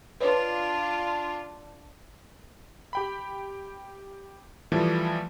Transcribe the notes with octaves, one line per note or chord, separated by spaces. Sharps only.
D4 F4 B4 C#5
G4 G5 B5
E3 F3 G3 A3